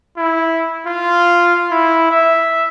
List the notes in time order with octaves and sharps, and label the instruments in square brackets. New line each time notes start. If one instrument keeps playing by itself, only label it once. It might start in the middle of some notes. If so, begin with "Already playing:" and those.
[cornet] E4
F4
E4
E5